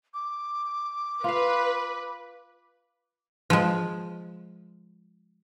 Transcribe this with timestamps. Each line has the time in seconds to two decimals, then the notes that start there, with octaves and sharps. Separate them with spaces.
0.14 D6
1.24 F4 B4 F5
3.50 F3 G#3